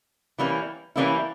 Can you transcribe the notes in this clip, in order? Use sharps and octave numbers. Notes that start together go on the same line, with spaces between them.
E3 G3 A#3 C#4 E4
E3 G3 A#3 C#4 E4